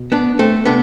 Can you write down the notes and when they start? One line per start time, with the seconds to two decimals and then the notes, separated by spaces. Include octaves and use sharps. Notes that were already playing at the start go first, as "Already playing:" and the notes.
Already playing: B2
0.12 B3 D4
0.39 A3 C4
0.65 C3 B3 D4